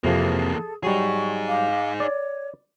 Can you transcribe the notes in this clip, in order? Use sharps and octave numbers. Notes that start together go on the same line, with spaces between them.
F2 C3 E3 F3 A#3 G#4 A4
F#3 G3 D#4 G#4 C#6
F5 D6
C#5 D5